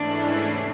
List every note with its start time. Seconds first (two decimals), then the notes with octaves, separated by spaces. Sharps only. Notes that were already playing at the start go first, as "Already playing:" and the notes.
Already playing: G#2 E3 A3 C#4 D4 E4
0.42 E2 C3